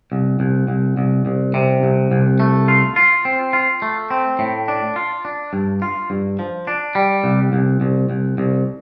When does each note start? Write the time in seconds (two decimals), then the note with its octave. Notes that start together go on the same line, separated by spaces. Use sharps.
0.12 C2
0.40 C2
0.68 C2
0.97 C2
1.26 C2
1.54 C3
1.83 C2
2.12 C2
2.40 A3
2.68 F4
2.96 F4
3.25 C4
3.53 F4
3.82 A3
4.11 C4
4.39 A2
4.68 D4
4.96 F4
5.25 D4
5.53 G2
5.82 F4
6.10 G2
6.39 F3
6.67 D4
6.95 G3
7.24 C2
7.53 C2
7.81 C2
8.10 C2
8.38 C2